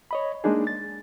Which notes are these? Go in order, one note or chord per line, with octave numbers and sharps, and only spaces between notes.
C#5 D#5 B5
G#3 A#3 D4 D#4 G#4
A6